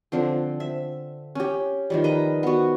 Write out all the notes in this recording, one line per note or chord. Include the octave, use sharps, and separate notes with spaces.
D3 F3 C4
E5
C#4 G4
D#3 F3 G3
B4 D#5 A#5
B3 F#4